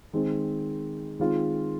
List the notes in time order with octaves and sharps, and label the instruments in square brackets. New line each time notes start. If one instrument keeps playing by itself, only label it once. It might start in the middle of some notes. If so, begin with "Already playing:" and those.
[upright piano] D#3 G#3 C4
D#3 G#3 C4 F4